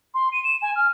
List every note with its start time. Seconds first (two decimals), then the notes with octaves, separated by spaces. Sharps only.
0.14 C6
0.32 D#7
0.44 E7
0.62 G#5
0.76 F6